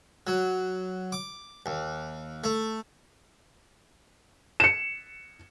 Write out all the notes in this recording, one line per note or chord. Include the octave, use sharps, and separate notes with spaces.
F#3
D6
D#2
A3
C#7 E7